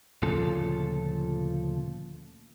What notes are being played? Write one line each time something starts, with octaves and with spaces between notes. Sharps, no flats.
D2 A#2 C#3 F3 A4